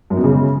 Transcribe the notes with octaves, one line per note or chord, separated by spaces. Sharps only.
F#2
B2
C#3